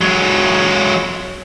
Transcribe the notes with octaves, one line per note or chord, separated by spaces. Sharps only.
F#3 G#3